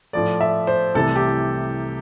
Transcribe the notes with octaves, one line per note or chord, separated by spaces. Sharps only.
A2 F3 A3 D5
E5
C5
C2 C3 E3 A3 A4
G4